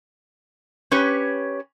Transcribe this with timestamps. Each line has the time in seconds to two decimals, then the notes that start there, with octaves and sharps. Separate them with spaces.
0.91 C#4 G4 B4 C#5